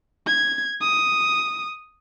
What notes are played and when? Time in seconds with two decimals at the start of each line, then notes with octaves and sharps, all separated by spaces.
0.27 G#6
0.81 D#6